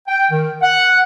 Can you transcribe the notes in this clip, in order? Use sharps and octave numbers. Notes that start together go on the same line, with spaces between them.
G5
D#3
F#5